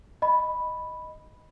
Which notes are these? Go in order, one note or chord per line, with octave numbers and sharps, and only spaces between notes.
D#5 B5